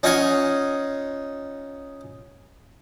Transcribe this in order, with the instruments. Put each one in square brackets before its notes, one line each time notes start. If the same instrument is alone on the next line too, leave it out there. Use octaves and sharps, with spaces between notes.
[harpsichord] C#4 D#4 F4 D#5 F#5 G#5